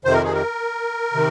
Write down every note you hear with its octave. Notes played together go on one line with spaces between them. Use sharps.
F2 C3 D#3 C5
A#4
G#4
A#4
C3 D#3